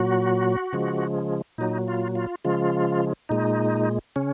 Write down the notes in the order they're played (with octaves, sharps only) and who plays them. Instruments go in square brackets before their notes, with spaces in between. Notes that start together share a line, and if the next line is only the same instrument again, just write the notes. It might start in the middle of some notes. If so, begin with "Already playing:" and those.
Already playing: [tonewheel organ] A#2 F#3 F#4
C#3 F3 G#3
A#2 F#3 D#4
F4
F4
C#3 F3 G#3 F4
A#2 G#3 D#4
C#3 C#4